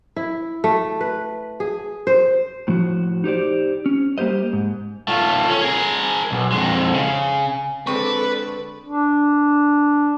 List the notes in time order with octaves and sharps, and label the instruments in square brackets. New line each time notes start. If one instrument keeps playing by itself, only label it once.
[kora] E4
A3
B4
G#4
C5
[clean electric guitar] A2 F3 F#4
D#4 G4 C5 D5
C#4
G3 A#3 G4 C5 D#5
G#2
[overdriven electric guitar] A3 F4
C#4
G#4 A#4
B1
F2 G#3
C#3
[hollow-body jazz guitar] D3 G#3 C4 [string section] A4 D5 [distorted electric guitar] B4 [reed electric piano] C#6
[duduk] D4